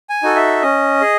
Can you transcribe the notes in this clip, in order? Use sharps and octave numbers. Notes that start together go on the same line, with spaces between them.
G#5
D#4 F#4 A4
E5
C#4 D#5
G#4